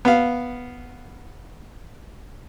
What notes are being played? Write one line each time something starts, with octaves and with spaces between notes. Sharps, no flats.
B3 F5